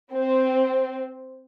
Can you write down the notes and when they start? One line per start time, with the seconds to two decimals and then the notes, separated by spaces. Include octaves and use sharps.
0.13 C4